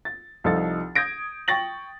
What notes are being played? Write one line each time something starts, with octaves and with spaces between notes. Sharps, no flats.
A6
C2 F3 D#4 A4 A6
D#6 G6 G#6 A#6 D7
G5 C#6 A6 A#6 F#7